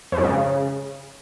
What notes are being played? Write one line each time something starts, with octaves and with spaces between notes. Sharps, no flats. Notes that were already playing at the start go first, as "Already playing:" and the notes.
F2
F#2
G#2
C#3